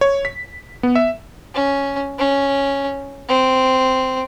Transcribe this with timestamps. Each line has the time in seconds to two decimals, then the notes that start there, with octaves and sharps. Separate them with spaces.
0.01 C#5
0.25 B6
0.83 B3
0.96 E5
1.54 C#4
2.18 C#4
3.29 C4